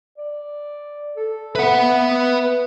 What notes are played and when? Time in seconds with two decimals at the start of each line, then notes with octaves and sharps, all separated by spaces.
0.18 D5
1.17 A4
1.55 B4 E5 F#5